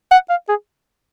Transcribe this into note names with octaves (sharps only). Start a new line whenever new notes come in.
F#5
F5
G#4